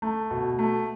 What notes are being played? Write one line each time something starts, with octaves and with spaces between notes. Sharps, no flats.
A3
B2
A3